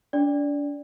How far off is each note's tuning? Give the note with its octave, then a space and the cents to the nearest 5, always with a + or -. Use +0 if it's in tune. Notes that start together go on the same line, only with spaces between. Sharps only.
D4 -35 D5 -5